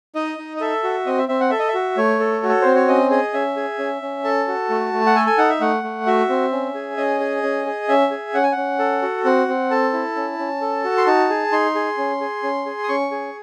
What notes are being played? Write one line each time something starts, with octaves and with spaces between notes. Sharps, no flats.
D#4 D#5
D#4
D#5
A4 E5
F#4
C4 D#5
E5
C4 E5
F#5
A4 E5
D#5
E5
F#4
A3 C#5
A4
F#4
A4
C4 C5
C#5
C#4 D#5
G#4 D#5
C#4 E5
G#4
C#4
C#4
A4 A5
F#4
A3
A3
F#5
A4 G#5
G#5
D#4 F#5
E5
A3 F#5
A3
F#4 E5
C4
C#4
G#4
C#4 D#5
G#4
C#4
G#4
C#4 E5
G#4
C#4 F#5
G#5
F#5
C#4
A4
F#4
C4 F#5
C4
A4 A5
E4
C#4
C#4
A4
F#4
C6
D#4 A5
G#4
D#4 C6
G#4
C#4
G#4
C#4
G#4
D#6
C#4 C#6
G#4